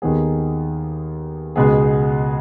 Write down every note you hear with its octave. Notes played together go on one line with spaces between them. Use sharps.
D#2 D#3 B3 G#4
C#2 B2 G#3 B3 G#4